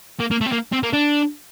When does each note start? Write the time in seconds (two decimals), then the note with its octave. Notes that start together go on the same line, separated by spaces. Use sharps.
0.20 A#3
0.31 A#3
0.41 A3
0.46 C4
0.52 A#3
0.73 C4
0.83 A#3
0.93 D4